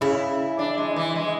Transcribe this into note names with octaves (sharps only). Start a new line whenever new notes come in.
C#3 E4
D4
G#3
E3
G#3